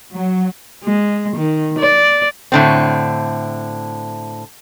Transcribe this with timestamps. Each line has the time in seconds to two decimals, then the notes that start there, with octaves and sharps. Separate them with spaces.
0.13 F#3
0.84 G#3
1.36 D#3
1.79 D5
2.52 A2 D3 C4